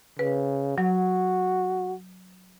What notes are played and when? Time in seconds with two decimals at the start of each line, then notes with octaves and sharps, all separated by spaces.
0.19 C#3 B4
0.78 F#3 F#4